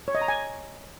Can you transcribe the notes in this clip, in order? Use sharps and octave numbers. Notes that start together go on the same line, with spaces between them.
C#5
D#5
A#5
G#5